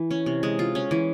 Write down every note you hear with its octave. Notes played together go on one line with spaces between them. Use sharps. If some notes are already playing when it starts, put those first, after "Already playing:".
Already playing: E3
C#4
C3
G#3
F4
C#4
E3